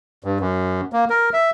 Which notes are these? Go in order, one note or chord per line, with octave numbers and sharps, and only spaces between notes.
G2
F#2
A#3
A#4
E5